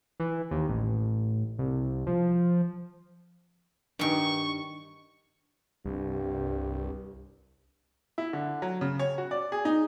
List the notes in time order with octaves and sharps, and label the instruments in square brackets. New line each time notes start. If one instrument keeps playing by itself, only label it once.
[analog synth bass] E3
D#2
A1
C2
F3
[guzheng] G2 D#3 [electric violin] C#6
[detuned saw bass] C2 [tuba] G2
[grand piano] E4
D3
F#3
C#3
C#5
F#4
D5
G#4
D#4